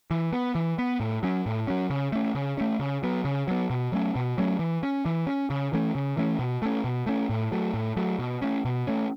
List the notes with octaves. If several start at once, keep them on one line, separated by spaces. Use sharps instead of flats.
E3
B3
E3
B3
A2
F#3 C#4
A2
F#3 C#4
C#3
A3 C#4
C#3
A3 C#4
C#3
F#3 B3
C#3
F#3 B3
B2
F#3 A3 C#4
B2
F#3 A3 C#4
E3
C#4
E3
C#4
C#3
E3 A3 C#4
C#3
E3 A3 C#4
B2
A3 C#4
B2
A3 C#4
A2
F#3 A3
A2
F#3 A3
B2
A3 C#4
B2
A3 C#4